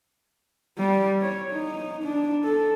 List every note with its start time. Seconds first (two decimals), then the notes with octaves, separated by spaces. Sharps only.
0.78 G3
1.22 C#5
1.52 D#4
2.04 D4
2.44 A4